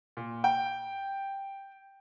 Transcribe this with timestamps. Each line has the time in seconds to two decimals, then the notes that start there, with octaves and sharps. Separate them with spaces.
0.17 A#2
0.44 G5